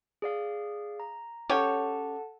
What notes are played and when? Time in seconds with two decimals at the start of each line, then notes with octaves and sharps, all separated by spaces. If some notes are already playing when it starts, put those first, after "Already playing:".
0.22 G#4 D5 F5
1.00 A#5
1.49 C#4 G4 A4 C#5 F#5 A5